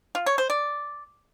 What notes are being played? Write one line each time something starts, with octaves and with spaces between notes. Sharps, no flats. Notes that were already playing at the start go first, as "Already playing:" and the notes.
F4
C#5
C5
D5